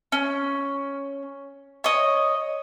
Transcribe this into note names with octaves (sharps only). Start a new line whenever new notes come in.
C#4
C#5 D#5